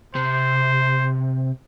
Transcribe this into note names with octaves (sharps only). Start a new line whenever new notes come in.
C3 C5